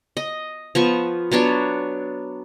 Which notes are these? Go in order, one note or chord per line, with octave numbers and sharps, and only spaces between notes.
D#5
F3 B3 C#6
F#3 B3 D4 C#5